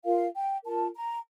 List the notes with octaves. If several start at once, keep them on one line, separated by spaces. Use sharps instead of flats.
F4 A#4 F5
G5
F4 A#4 A5
A#5